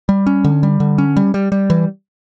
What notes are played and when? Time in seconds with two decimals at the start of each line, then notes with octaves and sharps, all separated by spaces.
0.09 G3
0.27 C#4
0.44 D3
0.63 G3
0.80 D3
0.98 C#4
1.16 G3
1.34 G3
1.52 G3
1.70 E3